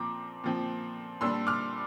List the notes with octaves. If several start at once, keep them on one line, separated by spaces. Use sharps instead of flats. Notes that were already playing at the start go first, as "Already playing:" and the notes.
Already playing: A#2 F3 C4 A#5 D6
A#2 F3 C4
A#2 G3 D4 C6 E6
D6 F6